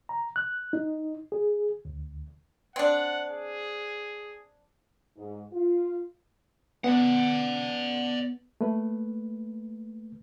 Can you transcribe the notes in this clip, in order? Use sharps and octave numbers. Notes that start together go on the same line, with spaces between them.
A#5
F#6
D#4
G#4
D2
C4 D4 F#5
G#4
G#2
F4
B3 D5 F#5
A3 A#3 B4